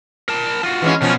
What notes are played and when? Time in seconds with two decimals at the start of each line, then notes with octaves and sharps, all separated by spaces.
0.29 A#4 A5
0.63 F4 F#4
0.82 E3 G#3 C#4
1.02 B2 F3 F#3 C#4